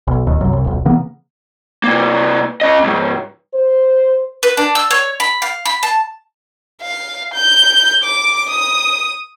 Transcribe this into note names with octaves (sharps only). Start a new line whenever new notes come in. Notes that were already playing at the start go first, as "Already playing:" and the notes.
B1
D1 D#2
C2 F#2
C2
D#1 B1
C#3 E3 A#3 B3
C3 A#3
C#4 D#5
C#2 G#2
C5
B4
D4
E6
C#5
B5
F5
B5
A5
F5
G6
D6
D#6